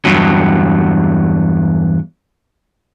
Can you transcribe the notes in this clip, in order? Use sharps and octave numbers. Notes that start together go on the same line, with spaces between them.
E2 G2 F#3